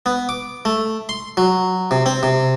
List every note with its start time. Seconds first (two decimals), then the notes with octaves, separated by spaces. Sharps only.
0.06 B3
0.29 D6
0.65 A3
1.09 C6
1.37 F#3
1.91 C3
2.06 C4
2.23 C3